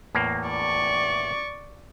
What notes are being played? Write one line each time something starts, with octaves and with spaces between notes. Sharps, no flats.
E2 A2 A#3
D5 C#6